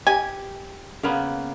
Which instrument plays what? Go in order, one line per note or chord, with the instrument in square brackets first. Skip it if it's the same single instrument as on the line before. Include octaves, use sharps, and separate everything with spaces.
[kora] G4 [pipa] G#5
[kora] C#3 A#3 B3